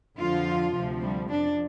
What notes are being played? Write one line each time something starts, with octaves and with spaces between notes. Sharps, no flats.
F2 D3 F3 F4
D2 C3 F3
G3
F2 F3 D4